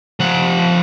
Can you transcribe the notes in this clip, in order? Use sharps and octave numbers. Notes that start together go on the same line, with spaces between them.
F3 F#5